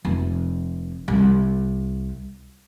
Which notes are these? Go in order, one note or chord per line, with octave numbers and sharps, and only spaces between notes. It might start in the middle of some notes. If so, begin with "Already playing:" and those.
F1
C2